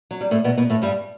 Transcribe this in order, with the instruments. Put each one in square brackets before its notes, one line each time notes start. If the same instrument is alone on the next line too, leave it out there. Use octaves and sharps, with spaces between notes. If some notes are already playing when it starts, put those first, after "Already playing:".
[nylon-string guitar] F#3
G3
A2 A3
B2 B3
B2 B3
A2 A3
G2 G3